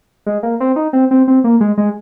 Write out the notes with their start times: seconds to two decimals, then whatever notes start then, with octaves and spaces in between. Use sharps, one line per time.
0.26 G#3
0.43 A#3
0.60 C4
0.76 D#4
0.93 C4
1.11 C4
1.28 C4
1.44 A#3
1.61 G#3
1.78 G#3